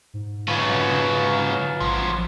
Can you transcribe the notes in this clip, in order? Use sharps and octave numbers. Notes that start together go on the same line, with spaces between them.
G#2
C#3 F#3 F4 B4
A1 F3 F#3